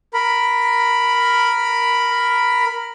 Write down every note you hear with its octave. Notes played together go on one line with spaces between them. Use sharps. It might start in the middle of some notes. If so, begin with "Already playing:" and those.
A#4 B5